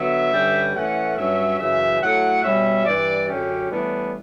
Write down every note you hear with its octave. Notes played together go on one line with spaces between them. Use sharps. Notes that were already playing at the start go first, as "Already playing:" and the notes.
Already playing: D3 F#3 B3 E5
G2 D3 G3 C#4
A2 E3 A3 C#4 F#5
G2 F#3 C#4 E5
F#2 C#3 E3 E5
A2 F#3 A3 F#5
B2 G3 C#4 E5
G2 E3 G3 D5
F#2 D3 F#3 C#4 G4
A2 E3 G3 B3 D4